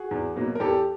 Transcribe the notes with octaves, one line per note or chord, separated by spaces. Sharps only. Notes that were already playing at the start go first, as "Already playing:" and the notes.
Already playing: F#4 G#4
E2
B2 F#3 A#3
A#4
E2 G4 A4